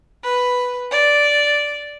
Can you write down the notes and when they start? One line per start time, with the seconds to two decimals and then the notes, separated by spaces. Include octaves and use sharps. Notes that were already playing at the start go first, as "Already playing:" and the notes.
0.24 B4
0.91 D5